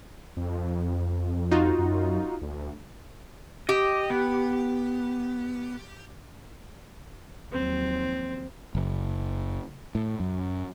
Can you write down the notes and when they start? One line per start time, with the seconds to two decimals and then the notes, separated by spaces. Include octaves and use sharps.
0.37 F2
1.51 D#4 F4 F#4
1.79 F#2
2.42 D2
3.69 G4 D#5
4.10 B3
7.53 D#2 F3 F#3 C4
8.75 F#1
9.95 A2
10.20 F#2